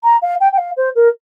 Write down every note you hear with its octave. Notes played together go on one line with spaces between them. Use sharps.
A#5
F5
G5
G5
F5
C5
A#4